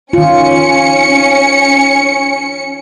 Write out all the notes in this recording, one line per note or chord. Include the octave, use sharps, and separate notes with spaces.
D#3 C#4 F4 C#7